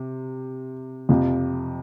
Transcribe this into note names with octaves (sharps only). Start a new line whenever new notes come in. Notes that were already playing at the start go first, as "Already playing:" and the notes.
Already playing: C3
F2 C3 F3